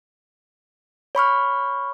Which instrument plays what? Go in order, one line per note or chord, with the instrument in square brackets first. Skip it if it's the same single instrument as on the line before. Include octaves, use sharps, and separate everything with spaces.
[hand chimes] C#5 B5 C#6 F6